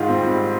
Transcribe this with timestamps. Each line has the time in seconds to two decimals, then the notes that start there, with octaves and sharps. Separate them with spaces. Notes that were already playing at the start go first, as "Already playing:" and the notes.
Already playing: G#2 D#3 F4 F5
0.09 C4
0.23 G3